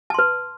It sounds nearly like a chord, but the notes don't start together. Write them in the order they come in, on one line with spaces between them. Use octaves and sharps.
A5 C6 B4